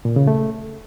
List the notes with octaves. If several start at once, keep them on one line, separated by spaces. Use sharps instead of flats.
A#2
C#3
A3